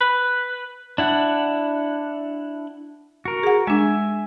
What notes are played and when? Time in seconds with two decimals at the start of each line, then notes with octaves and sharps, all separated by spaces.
0.01 B4
0.98 D4 E4 F#5
3.25 F#4 A#4
3.43 G#4 F#5
3.67 G#3 D4 E5 G#5